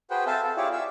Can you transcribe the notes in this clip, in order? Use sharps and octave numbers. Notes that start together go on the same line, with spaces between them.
F#4 G#4 B4 C5 F#5 G5
C4 A4 C5 E5 F5 A5
A4
E4 F4 G4 G#4 C#5 D5
E5 F5 E6